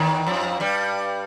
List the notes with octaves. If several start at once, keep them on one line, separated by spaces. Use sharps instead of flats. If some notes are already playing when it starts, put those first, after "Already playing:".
Already playing: D#2 D#3
F2 F3
G2 G3